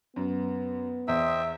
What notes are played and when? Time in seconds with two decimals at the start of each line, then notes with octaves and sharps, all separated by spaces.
0.16 F#2 B3
1.08 E2 C5 D#5 E5 G5